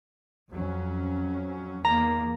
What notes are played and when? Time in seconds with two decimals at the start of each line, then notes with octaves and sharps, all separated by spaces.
0.52 F2 F#3 C#4
1.85 E2 D#3 A#3 A#5